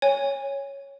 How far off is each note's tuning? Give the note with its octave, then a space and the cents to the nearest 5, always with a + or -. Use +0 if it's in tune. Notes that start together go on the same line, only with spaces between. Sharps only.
C#5 +0 G#5 -25